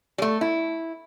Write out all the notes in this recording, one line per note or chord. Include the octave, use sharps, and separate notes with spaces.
G3 A3
E4